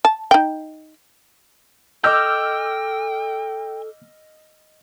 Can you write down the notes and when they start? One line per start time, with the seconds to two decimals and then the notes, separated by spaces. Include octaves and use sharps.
0.05 A5
0.31 D#4 G5
2.04 A4 D#5 G5 D6 E6 F6 G6